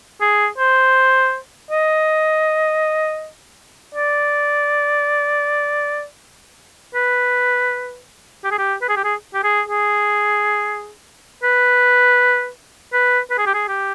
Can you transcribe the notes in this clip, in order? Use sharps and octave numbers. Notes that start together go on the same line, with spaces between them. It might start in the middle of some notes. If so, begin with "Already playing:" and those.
G#4
C5
D#5
D5
B4
G4
G#4
G4
B4
G#4
G4
G#4
G4
G#4
G#4
B4
B4
B4
G#4
G4
G#4
G4